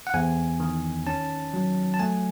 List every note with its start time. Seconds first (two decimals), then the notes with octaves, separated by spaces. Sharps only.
0.07 F#5
0.14 E2 G#5
0.60 D#3
1.07 C#4 A5
1.54 F#3
1.94 A5
1.99 A3 G#5